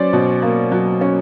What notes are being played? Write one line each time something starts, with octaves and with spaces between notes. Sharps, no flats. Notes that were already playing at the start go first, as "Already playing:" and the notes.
Already playing: F#3 C#4 C5 D5
B2
A#3
F#3
C#4